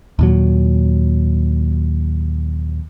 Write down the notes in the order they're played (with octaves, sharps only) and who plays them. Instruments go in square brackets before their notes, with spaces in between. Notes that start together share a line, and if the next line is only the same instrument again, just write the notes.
[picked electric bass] D#2 A#2 F#3